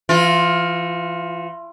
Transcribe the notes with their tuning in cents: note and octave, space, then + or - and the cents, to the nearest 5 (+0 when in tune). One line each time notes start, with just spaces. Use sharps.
E3 +40 F4 +15